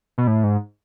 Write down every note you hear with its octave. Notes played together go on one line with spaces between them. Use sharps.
B2
A2
G#2